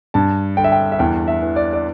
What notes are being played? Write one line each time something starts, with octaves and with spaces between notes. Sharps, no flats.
G2 A5
D3 G5
E5
G5
E5
E2 G5
E5
E3
D5
D5